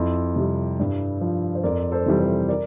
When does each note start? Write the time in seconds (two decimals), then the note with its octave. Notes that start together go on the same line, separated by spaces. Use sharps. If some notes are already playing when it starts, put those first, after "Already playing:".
Already playing: F2 E4
0.36 C3 G3
0.79 G2
1.21 F3
1.55 C5
1.64 F2 A#4 D5
1.92 A4 C5
2.06 C3 E3 G3
2.20 A4 C5
2.49 A#4 D5